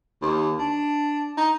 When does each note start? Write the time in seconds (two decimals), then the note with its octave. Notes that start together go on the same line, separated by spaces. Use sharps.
0.22 D#2
0.59 D4
1.37 D#4